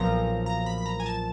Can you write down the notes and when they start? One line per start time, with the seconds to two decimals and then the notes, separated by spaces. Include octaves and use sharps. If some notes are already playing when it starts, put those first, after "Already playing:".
Already playing: B1 A#2 F3 A#5
0.46 A#5
0.66 B5
0.78 B5
0.86 A#5
1.00 G#5
1.06 A5